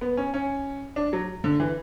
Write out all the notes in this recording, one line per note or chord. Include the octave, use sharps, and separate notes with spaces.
B3
C#4
C#4
D4
F#3
D3
E3